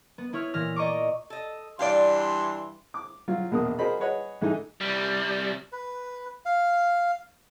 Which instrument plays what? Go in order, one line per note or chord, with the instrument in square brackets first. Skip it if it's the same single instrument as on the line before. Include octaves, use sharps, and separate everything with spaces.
[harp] B3
B3 E4 C#5 F6
A#2 E3 F6 A#6
D5 D#5 A#5 C#6 D6
[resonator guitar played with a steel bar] A4 D#5
[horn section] G2 E3 C6 [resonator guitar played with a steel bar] D5 F5
[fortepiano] D6
F#3 F4
A#1 E2 B2 A#4 D#6
F#4 G#4 A#4 C5 D#5 B5
G#4 B4 C#5 D#5 F#5
G#2 E3 A3 D#4 G#5
[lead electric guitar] C2 G3
[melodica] B4
F5